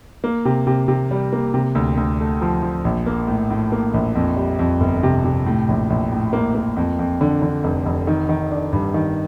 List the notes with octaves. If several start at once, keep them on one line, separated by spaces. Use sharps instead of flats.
A#3
C3
C3
C3
G3
A#3
C3
D2
D2
A3
F3
F3
A#1
A#3
A2
A2
A#3
A#1
F2
G3
F2
G1
C3
C3
A2
A#1
A#1
A2
A#3
A#3
F2
F2
D3
D3
F1
F1
D#3
D#3
D4
G2
D#3